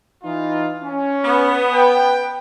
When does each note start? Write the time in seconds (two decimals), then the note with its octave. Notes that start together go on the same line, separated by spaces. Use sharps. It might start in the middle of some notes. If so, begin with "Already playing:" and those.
0.24 E3 D#4 F4
0.83 C#4
1.25 B3
1.73 B4 G5